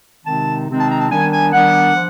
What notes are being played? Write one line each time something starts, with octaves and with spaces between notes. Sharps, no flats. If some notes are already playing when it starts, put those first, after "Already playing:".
C3 D#3 G#3 C4 D#4 A5
C3 D#3 G#3 C4 D#4
A5
A#5
A5
D#3 G3 B3 D4 G#5
G#5
D#3 G3 B3 D4 F#5
F3